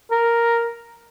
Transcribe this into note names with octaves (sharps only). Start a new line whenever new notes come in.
A#4